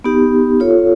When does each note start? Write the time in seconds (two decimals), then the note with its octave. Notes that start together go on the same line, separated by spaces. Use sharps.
0.04 B3 D#4 G4
0.60 F4 A4 C#5 F5